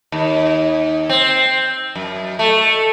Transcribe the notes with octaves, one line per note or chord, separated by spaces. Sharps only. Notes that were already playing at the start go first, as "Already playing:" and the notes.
D#2
C4
F#2
A3